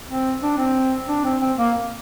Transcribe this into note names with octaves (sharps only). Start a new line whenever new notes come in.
C4
D4
C4
D4
C4
C4
A#3